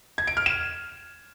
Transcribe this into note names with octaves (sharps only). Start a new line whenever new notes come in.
G#6
D7
F6
E7